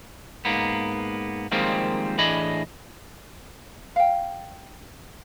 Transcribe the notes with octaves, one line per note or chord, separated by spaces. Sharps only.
G#2 A#3 B3
D#3 F3 G3 G#3 A#3 C4
A2 E3 D4 G#4 D#5 B5
F5 G5